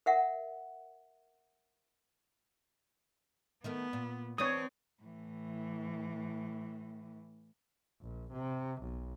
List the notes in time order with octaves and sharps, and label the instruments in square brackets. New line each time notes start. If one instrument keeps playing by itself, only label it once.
[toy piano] A#4 E5 F#5
[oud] D#3 A3 A#4 [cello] B3
[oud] A#2
[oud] E3 D4 [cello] C4 [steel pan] C#5 D#6
[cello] A2 E3
[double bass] A#1
C3
B1